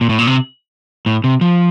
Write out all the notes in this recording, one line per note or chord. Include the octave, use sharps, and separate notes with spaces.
A#2
A2
A#2
C3
A2
C3
F3